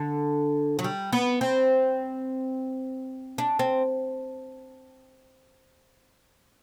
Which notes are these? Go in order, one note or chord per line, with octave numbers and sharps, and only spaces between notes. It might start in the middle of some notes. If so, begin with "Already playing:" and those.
Already playing: D3
F#3
G3
B3
C4
D4
C4